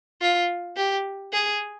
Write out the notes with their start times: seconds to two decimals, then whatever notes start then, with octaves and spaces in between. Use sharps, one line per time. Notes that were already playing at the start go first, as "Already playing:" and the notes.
0.22 F4
0.77 G4
1.33 G#4